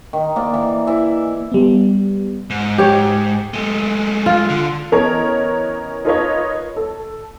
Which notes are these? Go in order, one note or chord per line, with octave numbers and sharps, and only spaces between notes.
D#3
A#3 D5
E3
E3 E4 E5
G3 B3
G#2
G4 C#5
G#3 A3
F4
D3
E3 B3 C#4 A#4 C#5 D#5
D#4 F4 A#4 B4 C#5 D#5
A4